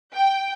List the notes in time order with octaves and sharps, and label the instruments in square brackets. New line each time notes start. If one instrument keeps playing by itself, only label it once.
[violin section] G5